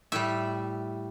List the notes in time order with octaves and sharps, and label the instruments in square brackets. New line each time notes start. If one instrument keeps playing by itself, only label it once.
[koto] A2 G3 E5